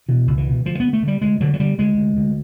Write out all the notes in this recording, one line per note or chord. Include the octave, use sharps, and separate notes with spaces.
B2 E3
C#2
E3
B2
D2 F3
D2 B3
A3
D3 G3
D2 G#3
D3 F#3
F#3
D3 G3
D2 G#3
D2
D2